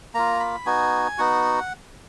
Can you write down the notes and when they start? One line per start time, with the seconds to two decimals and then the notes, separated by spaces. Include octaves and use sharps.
0.14 A#3 F4 A#5
0.40 B5
0.66 B3 D#4 F#4 G#5
1.18 B3 D#4 F#4 F#5